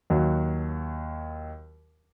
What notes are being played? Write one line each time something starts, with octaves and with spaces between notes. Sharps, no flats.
D#2 F#3